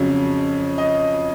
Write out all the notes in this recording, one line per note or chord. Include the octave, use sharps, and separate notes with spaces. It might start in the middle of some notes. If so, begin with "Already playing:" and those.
Already playing: F2 C#3 F#3 C#4
D#5